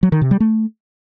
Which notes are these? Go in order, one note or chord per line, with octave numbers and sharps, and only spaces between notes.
F#3
D#3
C3
G3
A3